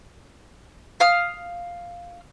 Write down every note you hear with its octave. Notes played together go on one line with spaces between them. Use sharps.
F5 D#6 F6